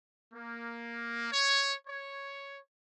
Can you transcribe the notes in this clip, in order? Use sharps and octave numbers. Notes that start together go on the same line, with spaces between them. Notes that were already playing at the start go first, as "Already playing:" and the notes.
A#3
C#5
C#5